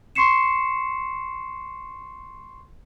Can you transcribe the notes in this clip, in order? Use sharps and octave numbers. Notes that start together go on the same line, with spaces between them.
C6 C#6 C7 C#7 E7